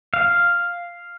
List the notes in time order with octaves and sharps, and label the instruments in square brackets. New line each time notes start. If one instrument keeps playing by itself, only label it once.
[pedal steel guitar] F5